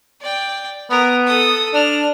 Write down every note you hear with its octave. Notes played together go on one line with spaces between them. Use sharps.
D5 G5
B3 A#4
A4 D#6
D4 F6